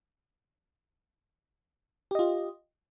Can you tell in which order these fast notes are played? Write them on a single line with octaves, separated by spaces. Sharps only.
G4 D#5 F4